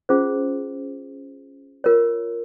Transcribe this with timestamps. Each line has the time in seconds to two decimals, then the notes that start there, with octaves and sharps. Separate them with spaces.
0.09 C#4 F4 G#4 C5
1.84 F4 A#4 C#5